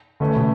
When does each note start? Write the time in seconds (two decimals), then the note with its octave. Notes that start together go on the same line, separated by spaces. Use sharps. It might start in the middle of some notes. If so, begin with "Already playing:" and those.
0.20 A2 D3 E3 A3 C#4
0.36 B2